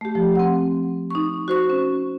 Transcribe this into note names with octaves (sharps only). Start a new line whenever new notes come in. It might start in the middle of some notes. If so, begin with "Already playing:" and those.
A3 G4
F3
C4 F#5
D#4 C#6
F#4 C5 C#6
C#4